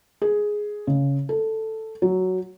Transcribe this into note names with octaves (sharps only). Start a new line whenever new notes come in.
G#4
C#3
A4
F#3